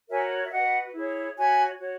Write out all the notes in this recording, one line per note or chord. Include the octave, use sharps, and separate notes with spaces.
F#4 A#4 C#5 E5 G#5
E5
F#4 B4 D#5 F#5
E4 G#4 C#5
F#4 C#5 E5 G#5
F#4 C#5